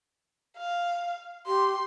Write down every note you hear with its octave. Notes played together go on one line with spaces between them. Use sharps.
F5
G4 C6